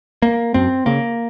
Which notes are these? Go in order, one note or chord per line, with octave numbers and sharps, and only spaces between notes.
A#3
F#2 C4
C#3 A#3